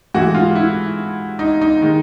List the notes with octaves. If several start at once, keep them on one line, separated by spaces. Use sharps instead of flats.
G#2 E3 A3 F#4
F4
E4
D#4
D#4
D#3 G#3